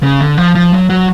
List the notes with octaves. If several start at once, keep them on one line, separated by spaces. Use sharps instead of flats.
C#3
D3
F3
F3
F#3
F#3